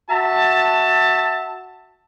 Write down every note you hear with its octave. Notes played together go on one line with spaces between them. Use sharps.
F#4 E5 A5